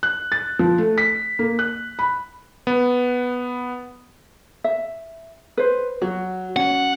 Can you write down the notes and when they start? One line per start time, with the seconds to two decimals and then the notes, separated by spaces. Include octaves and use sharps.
0.03 F#6
0.32 A6
0.59 F3
0.78 A3
0.98 B6
1.39 A#3
1.59 F#6
1.99 B5
2.67 B3
4.64 E5
5.57 B4 C5
6.02 F#3 F#4
6.57 C#4 F#5